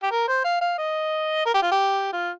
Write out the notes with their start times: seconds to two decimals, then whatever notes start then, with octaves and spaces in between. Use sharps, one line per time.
0.03 G4
0.11 A#4
0.28 C5
0.44 F5
0.61 F5
0.78 D#5
1.46 A#4
1.54 G4
1.62 F4
1.71 G4
2.13 F4